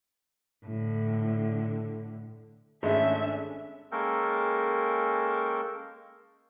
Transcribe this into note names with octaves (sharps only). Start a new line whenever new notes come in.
A2 D3
G#1 G#3 A3 C#4 D4 E5
G#3 A#3 C#4 A4 A#4 G5